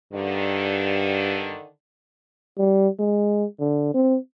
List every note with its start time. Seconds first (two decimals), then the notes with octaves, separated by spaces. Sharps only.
0.13 G2 D3 D#3
2.58 G3
2.99 G#3
3.60 D3
3.94 C4